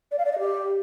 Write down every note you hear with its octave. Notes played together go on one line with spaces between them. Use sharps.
D5
F5
D5
D#5
G4